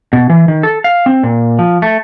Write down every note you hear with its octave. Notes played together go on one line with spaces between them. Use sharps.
B2
E3
D#3
A4
F5
C4
A#2
F3
A3